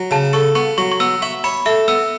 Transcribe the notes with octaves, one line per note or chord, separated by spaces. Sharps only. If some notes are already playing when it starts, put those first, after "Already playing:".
Already playing: F#3
C#3 A5
A4 C#6
B3 C#6
F#3 C#6
C#6
B3 E6
E5 C#6
C#5 B5
A4 E5
B3 E6